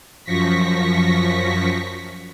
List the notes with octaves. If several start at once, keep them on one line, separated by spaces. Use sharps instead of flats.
F#2 F3 C#6 A#6 B6